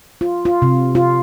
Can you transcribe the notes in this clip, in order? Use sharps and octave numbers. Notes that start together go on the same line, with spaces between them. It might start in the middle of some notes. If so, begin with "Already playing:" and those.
F4
F4
C3
F4